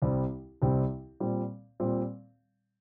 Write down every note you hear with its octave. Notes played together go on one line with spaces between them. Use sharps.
C2 C3 G3 C4
C2 C3 G3 C4
A#2 G3 C4
A#2 G3 C4